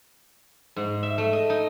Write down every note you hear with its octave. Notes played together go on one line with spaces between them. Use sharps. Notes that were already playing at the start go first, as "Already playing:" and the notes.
G#2
E5
A3
D#5
D#4